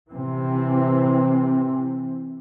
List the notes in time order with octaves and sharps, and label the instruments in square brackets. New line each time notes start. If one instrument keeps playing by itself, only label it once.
[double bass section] C3 E3 C4